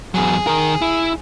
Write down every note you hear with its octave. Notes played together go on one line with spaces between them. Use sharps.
E2 F#3 G#4
D#3 A#4
E4